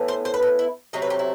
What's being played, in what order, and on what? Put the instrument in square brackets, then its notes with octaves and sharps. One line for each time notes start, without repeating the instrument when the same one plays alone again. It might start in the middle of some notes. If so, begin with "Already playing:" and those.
Already playing: [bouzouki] A2 E3 B3
C5
C5
B4
A4
E4
C3 F#3 A3 C4 D#5
B4
G4
E4